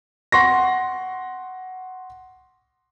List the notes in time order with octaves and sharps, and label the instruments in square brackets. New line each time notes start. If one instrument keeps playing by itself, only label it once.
[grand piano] F#5 C6 C#6 A#6